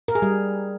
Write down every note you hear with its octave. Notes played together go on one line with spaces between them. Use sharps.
A#4
G#4
G3